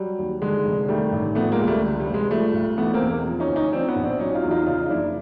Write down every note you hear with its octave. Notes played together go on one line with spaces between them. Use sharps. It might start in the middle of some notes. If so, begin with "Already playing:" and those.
Already playing: F#3 G3
D#2
D3 G#3
F1
D#3 G3 A3
A1
F3 A3 B3
G#3 A#3
C#2
G3 A3
D3
G3
F1
G#3
F3 G3 A3
B1
E3 A3 B3
A#3 C4
E2
F3
C#4 D#4
D2
C#4 D#4
F3 C4 D4
B3 C#4
A#1
C4 D4
F#3 C#4 D#4
D#4 F4
E2
D#4 F4
C#3 D#4 F4
F#1 D4 E4